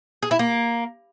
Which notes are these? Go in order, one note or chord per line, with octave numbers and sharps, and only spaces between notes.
G#4
E4
A#3